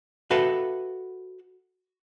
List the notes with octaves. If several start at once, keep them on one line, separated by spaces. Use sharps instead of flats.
F#4 A4 B4 E5 F5